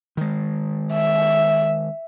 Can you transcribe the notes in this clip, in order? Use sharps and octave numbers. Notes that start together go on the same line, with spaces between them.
D#3 G#3
E5